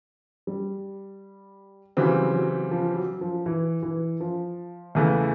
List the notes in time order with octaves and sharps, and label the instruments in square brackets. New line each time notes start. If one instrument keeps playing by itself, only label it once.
[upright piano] G3
[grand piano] C#3 E3 G3 C4 [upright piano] F#3
[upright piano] F#3
F3
F#3
F3
E3
E3
F3
[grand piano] E2 C#3 E3 A3